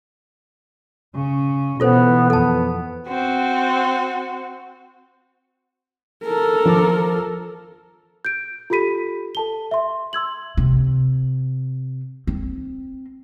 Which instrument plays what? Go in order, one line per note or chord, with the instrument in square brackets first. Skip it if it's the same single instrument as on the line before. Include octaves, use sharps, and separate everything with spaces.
[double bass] C#3 C#4
[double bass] B2 E3 [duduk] B3 [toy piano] F4 A4 C5
[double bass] F2 [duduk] B3 [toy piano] A4 A5
[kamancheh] C4 F#4
[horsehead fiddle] A4 A#4
[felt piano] F3 D6
[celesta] G6 D7
F4 G4 A4 B5 B6 D#7
A4 A5 G7
E5 C6
C6 E6 G#6 F#7
[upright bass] C3
C4